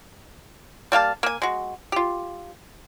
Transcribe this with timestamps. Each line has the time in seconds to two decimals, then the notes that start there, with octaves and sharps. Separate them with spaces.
0.92 G3 A#3 F5 A5
1.23 A#3 G#5
1.42 G#3 F#4
1.92 F4 G4